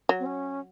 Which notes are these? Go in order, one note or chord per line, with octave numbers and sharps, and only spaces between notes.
F#3
C4
C#4